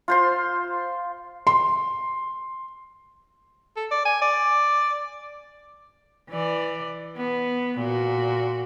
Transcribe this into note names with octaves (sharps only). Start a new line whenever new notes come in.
F4 C5 C6
C6
A4
D5
G#5
D5
E3 D5
B3
A#2 F#4